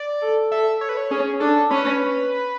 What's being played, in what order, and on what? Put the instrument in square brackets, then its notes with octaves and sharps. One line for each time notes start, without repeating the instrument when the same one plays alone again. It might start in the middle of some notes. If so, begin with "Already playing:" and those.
Already playing: [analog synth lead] D5
[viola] A4
[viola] A4 [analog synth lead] E5
[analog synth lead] C#5
B4
C#5
[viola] C#4 [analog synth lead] G#4
[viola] D4 [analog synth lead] A4
[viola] C#4 [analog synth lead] B4